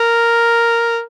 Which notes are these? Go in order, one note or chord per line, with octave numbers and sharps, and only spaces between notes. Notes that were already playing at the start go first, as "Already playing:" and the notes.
Already playing: A#4